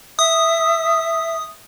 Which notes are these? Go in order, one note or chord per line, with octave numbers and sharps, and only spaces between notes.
E5 D#6